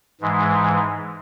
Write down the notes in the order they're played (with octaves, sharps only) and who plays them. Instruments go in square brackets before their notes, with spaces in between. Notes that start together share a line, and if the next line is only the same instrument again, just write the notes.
[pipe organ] G#2 E3 G#3